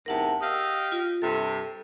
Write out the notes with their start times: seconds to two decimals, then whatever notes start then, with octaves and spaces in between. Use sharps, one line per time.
0.06 E2 G#2 C3 A#4 F#5 A5
0.41 G4 D#5 F5 D#6 E6
0.92 F4
1.22 G2 C3 A4